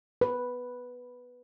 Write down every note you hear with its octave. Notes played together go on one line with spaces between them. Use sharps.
B4